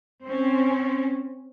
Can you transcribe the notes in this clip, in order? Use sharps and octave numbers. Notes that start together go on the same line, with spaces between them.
C4 C#4